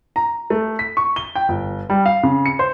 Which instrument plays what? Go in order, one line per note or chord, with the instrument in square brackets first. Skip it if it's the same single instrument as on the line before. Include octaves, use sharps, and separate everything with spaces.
[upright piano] A#5
A3
B6
C#6
G7
G5
G1
G3
F5
C#3
C#7
C5